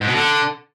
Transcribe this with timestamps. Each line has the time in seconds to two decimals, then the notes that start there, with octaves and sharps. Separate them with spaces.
0.01 G#2
0.07 B2
0.14 D3